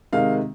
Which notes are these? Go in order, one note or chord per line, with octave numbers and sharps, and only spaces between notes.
C3 D#3 G#3 F5